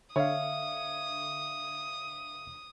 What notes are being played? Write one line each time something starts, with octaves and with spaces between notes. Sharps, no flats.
D3 C#5 E5 F5 D#6